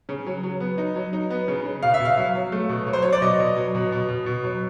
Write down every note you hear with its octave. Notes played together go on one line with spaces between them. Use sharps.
C#3
F#3
F#3
B3
D#4
F#3
D#4
B3
C#3
C#3
B2 F5
E5
B2
F5
F#3
F#3
A3
B2
F#3
C5
F#3 C#5
D5
B2 D#5
B2
F#3
B2
B2
B2
B2
F#3